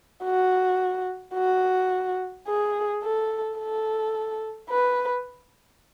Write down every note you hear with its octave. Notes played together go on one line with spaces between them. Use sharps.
F#4
F#4
G#4
A4
A4
B4